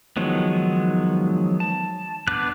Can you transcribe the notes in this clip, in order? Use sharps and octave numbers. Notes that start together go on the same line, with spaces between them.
D#3 F3 F#3 G#3 B3
A5
B3 D4 B4 D5 F#6